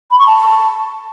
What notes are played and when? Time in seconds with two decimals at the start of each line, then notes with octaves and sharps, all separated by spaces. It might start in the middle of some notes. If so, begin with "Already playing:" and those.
0.10 B5
0.18 C#6
0.26 A5